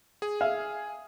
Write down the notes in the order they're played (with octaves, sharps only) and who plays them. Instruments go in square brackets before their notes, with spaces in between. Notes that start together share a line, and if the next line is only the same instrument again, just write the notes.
[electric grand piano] G#4 G#5
[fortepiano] E5 F5